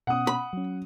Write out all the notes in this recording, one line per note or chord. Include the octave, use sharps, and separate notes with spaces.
B2 B3 C#4 F#5 D#6
B5
F#3 C#4